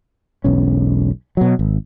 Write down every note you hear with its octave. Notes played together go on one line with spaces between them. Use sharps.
E1 B1 C#4
B2 F#3
G#1